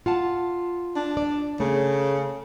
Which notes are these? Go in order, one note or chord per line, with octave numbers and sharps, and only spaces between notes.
F4 F#5 A5
D4
D5
C#3 A3